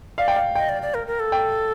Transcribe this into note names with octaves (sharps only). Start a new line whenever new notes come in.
D5 F5
G5
F5
D#5 G5
D5
D5
A#4
A#4
A4
G5